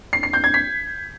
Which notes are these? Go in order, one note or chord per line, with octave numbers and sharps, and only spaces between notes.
C7
C7
G6
G#6
B6